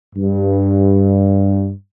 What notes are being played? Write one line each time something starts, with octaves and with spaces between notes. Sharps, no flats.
G2